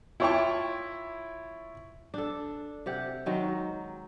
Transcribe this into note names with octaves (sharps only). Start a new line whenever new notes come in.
E4 F4 C#5 G5 A5 C#6
D4 A4
C3 G4 F#5
D#3 F#3 G#3